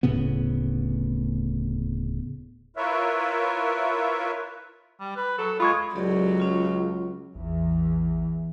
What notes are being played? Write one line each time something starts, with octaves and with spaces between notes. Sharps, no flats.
D1 A2 C#3 B3
E4 F4 A#4 B4 C#5 E5
G3
B4
F#3 A4
G#3 F4 B5 C#6 G#6
C#2 F#3 G4 A4 D5
C#4 F4
A1 E2 E3